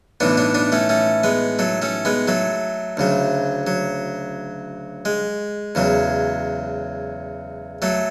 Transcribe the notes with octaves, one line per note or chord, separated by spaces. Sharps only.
B1 A2 E3 B3 D4
B3 D4
B3 D4
A3 C#4
A3 C#4
G#3 B3
F#3 A3
A3 C#4
G#3 B3
F#3 A3
D2 C#3 F#3
F#3
G#3
E2 C#3 F#3
F#3 A3